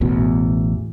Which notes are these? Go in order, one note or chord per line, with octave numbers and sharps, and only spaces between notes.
A1 E2 B2